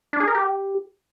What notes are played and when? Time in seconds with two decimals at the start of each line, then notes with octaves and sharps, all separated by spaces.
0.13 D4
0.20 G#4
0.27 A#4
0.35 G4